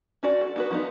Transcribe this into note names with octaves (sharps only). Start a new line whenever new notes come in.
C#4 F#4 D5
A4
B3 F#4 B4
F3 B3 D#4